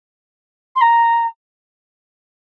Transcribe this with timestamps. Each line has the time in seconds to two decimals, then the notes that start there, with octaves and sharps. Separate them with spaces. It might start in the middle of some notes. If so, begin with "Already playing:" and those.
0.75 C6
0.81 A#5